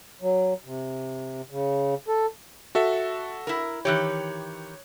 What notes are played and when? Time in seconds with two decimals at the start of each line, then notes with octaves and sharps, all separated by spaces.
0.22 F#3
0.64 C3
1.51 C#3
2.08 A4
2.75 F#4 A4 E5
3.47 E4 A#4
3.85 D#3 E3 G4 C#5 F#6